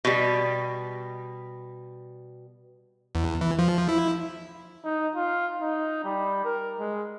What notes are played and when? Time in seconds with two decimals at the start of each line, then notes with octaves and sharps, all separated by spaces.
0.05 B2 G3
3.15 E2
3.41 E3
3.59 F3
3.89 E4
4.85 D#4
5.16 F4
5.61 D#4
6.04 G3
6.44 A#4
6.79 G#3